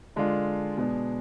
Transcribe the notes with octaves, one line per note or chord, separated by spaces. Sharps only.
D3 G#3 D4 F4
B2 G#3 B3 D4